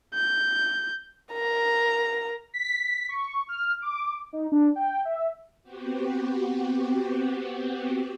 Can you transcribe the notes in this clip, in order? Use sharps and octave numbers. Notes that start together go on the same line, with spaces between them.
G6
A#4 A#5
B6
C#6
F6
D6
D#4
D4
G5
E5
B3 C4 F#4 G4